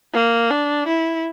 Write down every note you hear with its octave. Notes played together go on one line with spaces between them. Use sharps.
A#3
D4
E4